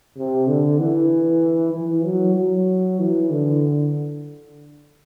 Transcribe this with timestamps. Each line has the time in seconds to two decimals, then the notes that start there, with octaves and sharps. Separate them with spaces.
0.17 C3
0.47 D3
0.79 E3
1.73 E3
2.04 F#3
2.36 F#3
2.99 E3
3.30 D3